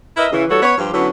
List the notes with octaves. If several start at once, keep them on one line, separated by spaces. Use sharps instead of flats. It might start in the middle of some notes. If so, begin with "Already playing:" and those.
E4 A#4 B4 D#5 E5
C#3 E3
E3 G3 F#4 A4 C#5
B3 C#5
G2 F3 F4 G4
D3 F#3 B3 C#4 E4